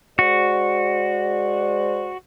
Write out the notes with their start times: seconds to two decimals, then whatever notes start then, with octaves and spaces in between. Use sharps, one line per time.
0.19 G#3 F#4 C5 D5